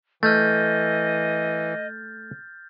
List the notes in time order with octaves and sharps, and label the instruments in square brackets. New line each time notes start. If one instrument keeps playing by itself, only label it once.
[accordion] E3 [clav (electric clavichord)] A3 [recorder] D#5 [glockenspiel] F6 G6 A6